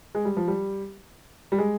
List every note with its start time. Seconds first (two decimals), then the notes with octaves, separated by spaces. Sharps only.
0.15 G#3
0.25 G3
0.37 F3
0.48 G3
1.52 G3
1.58 G#3